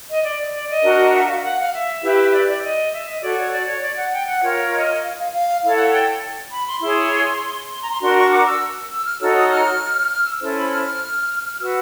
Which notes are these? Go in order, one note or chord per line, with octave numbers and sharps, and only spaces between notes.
D#5
D5
D5
D#5
D4 F#4 A#4
E5
F5
F#5
F5
E5
E4 G4 B4
D5
D5
D#5
E5
D#5
F#4 A4 C#5 D5
C#5
D5
C#5
D5
F#5
G5
F#5
F4 A#4 C#5
D#5
F5
F5
F5
E4 A4 C#5 F5
F#5
G5
B5
C6
E4 G#4 C#5 C6
C6
A#5
C6
D4 F#4 A#4 C6
C#6
D6
E6
E6
F6
D#4 F#4 A4 C#5 E6
D#6
F6
F6
E6
C#4 E4 A4 C5
B5
F6
F#4 B4 E6